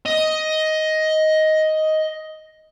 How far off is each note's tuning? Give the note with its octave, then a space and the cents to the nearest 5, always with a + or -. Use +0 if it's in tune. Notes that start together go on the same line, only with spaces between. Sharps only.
D#5 +10